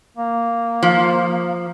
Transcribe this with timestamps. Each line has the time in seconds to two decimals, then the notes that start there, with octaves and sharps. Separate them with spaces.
0.17 A#3
0.83 F3